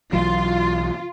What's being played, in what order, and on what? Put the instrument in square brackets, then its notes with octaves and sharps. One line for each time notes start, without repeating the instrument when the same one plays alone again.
[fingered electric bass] B1 E3 F#3 [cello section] F4